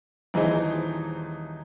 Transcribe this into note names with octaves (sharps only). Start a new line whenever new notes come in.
D#1 E3 D#4 G#4 C5 D#5